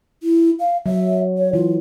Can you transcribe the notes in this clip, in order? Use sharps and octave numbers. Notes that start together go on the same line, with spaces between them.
E4
F5
F#3 E5
C#5
E3 F4